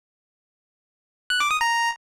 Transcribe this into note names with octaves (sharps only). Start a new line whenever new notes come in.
F#6
D6
D#6
A#5